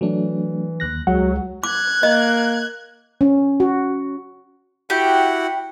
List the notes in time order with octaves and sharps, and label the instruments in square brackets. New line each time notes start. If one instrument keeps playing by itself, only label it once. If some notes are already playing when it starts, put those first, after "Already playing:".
[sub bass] E3 [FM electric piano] F#3 A3 D4
[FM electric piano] D#2 F#6 A#6
[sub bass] C#2 [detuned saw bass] F#3 [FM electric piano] G#3 [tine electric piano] F#5
[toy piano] D6 [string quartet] F#6 G#6
[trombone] A#3 [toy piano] D#5
[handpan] C#4
F#4
[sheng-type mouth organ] E4 F#4 F#5 [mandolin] G4 G5